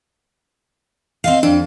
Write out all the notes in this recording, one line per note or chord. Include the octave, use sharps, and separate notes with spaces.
C4 D#5 F5
F2 D4